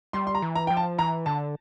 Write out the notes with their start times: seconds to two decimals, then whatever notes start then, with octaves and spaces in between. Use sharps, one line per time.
0.13 G3 C6
0.27 C6
0.35 A#5
0.42 E3
0.55 A#5
0.67 F3 G5
0.77 A5
0.98 E3 A#5
1.26 D3 A5